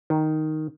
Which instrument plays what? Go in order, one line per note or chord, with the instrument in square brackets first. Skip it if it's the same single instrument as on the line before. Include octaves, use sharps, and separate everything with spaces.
[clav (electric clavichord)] D#3